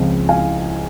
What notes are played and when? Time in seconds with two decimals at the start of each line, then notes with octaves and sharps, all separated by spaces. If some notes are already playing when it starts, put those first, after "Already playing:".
Already playing: C#2 C#3 F3 C4
0.29 F5 G#5